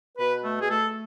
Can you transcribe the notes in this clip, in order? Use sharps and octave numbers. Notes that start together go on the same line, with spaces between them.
B2 B4
A3
G#4
A3 A4